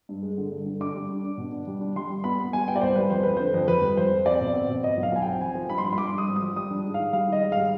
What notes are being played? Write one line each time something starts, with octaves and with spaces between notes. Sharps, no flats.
G2
G#3
D3
G2
D3
D4 D6
G3
D4
D4
B2
D4
G3
D4
G3 C6
G3
B3 B5
B3
G3 G#5
B3 G5
D5
C2 C5
G3 B4
F2 C5
F2 B4
D3 C5
F2
F2 B4
G3
F2 C5
F2
C4 D5
B2
C4
B2
B2 D#5
B1
F5
B1 G#5
C4 G5
F3 G#5
F3
G2 B5
C6
G2 B5
C6
G2 D6
G2
D#6
G#1
F3 D#6
G3 D#6
D4
G#2
D#3 F5
G3 F5
D#3 D#5
G#2
G3 F5